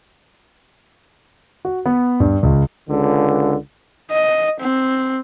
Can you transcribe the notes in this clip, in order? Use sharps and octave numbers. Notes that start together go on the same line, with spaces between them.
F#4
B3
G2
C#2
C#2 D3
D#5
C4